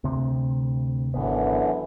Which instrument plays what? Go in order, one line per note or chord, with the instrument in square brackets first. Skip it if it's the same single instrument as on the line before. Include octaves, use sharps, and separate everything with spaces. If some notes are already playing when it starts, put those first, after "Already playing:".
[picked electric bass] D2 C3 C4
[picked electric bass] G#1 B3 [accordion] F#2 D3 E3